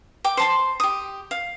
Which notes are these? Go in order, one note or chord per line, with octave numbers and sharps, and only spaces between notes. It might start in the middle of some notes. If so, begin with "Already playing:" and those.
G5 D6
C5 A5 C6
G4 D#6
F5